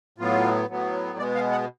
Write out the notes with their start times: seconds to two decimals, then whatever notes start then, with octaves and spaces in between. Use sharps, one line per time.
0.18 A2 F#3 B3 F4
0.69 A2 F#3 B3
1.18 B2 G#3 B3 D5
1.35 F5
1.51 F#5